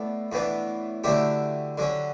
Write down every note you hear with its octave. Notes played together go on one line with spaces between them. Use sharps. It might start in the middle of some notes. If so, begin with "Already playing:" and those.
Already playing: A2 B3 D4 A4
A2 E3 B3 D4
D3 F#3 A3 D4 E4 G4
D3 F#3 C#4